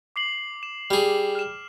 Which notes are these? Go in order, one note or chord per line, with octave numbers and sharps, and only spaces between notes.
D6 C7 F#7
E7
G3 G#4
F6 E7